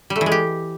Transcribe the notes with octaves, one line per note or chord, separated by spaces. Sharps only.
G3
A3
E3
G#3
G4